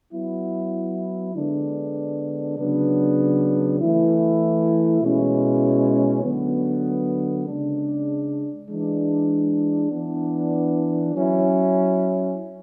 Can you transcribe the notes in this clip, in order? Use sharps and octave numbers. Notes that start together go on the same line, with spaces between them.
F#3 B3 E4
D3 G#3 B3 D4
C#3 F#3 B3 D4
E3 A3 E4
B2 G#3 C#4 E4
D3 F#3 B3
C#3 G#3 D4
E3 G#3 D4
E3 B3 D4
F#3 C#4 E4